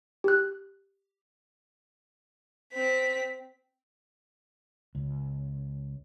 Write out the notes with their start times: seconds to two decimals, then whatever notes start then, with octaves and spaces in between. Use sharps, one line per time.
0.24 G4 F#6
2.73 C4 B6
4.95 C#2